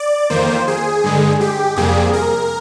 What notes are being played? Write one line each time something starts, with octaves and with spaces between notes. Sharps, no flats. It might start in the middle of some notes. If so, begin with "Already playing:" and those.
Already playing: D5
F2 D#3 A#3 C5
G#4
G2 D3 G#3
G4
F2 C3 G3 A#3 G#4
A#4